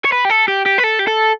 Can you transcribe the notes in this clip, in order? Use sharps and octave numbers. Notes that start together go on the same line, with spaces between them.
C#5
B4
G4
A4
G4
G4
B4
A4
G4
A4